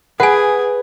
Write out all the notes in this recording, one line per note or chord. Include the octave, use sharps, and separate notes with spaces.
G#4 B4 F#5 G#5